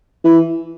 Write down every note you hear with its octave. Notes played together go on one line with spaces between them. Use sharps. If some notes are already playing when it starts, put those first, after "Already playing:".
E3